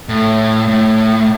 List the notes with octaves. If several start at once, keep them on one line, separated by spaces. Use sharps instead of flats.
A2
A2